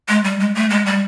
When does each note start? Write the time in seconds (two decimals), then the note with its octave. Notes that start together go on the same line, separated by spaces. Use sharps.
0.08 G#3
0.24 G3
0.39 G#3
0.55 A3
0.70 G#3
0.86 G3